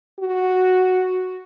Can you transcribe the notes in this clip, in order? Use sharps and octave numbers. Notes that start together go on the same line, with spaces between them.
F#4